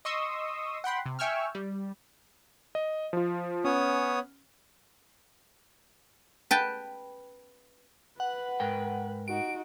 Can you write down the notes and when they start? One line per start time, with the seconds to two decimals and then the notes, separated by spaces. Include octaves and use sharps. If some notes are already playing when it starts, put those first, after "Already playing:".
0.05 D#5 C6 C#6 D#6 E6
0.84 F#5 G5 B5 C6
1.06 C3
1.19 E5 G5 G#5 C#6 E6 F6
1.55 G3
2.75 D#5
3.13 F3 F4
3.65 B3 C#4 C#5 D#6
6.51 B4 G5 A5
8.20 B4 F#5
8.60 G#2 A#4 G5
9.28 D#4 F#4 D7